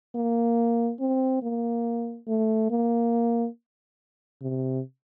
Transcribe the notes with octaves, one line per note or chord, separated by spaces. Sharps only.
A#3
C4
A#3
A3
A#3
C3